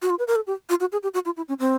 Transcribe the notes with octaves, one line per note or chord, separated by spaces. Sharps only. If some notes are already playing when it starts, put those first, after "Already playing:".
F#4
F4
B4
A#4
A4
G4
F4
F#4
G#4
G4
F#4
F4
E4
C#4
C4